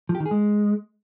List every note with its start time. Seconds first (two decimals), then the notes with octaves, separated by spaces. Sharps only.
0.09 F3
0.15 G4
0.20 D#3
0.26 G#4
0.31 G#3